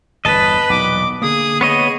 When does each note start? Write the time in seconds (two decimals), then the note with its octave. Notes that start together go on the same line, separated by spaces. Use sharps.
0.25 G1 E2 B4 D#5 A5
0.70 B1 E2 A#2 D6
1.22 D3 A#3 G#4 D#6
1.61 B3 C#5 D#5 D#7